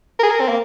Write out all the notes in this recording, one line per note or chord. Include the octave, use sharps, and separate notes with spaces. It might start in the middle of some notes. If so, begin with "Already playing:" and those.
A#4
G#4
A#4
C4
A#3